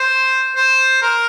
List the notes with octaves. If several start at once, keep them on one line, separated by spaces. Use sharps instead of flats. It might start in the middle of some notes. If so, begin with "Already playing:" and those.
Already playing: C5
C5
A#4